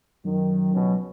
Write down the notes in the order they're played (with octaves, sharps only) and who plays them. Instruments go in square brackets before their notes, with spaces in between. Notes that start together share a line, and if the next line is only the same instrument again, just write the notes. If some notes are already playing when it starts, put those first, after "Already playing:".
[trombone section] F#2 D#3 [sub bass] F#3
[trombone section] C#2 B2 C#4